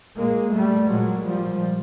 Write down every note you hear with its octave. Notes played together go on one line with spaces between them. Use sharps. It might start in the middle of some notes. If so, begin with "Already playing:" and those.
A#2 G#3 A#3
G3 A3
A#2 F#3 G#3
F3 G3